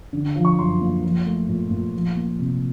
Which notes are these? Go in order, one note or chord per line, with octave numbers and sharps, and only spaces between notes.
D3
F3
C#6
F#2 C6
A#3
F3
A3
A#2
A#2
F3
A#3
C3